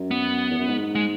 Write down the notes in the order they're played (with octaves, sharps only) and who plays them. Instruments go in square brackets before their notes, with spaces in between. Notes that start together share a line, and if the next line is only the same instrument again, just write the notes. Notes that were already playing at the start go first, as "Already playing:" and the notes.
Already playing: [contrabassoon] F#2
[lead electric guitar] B3
[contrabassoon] E2
F#2
G#2
[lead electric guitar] G#3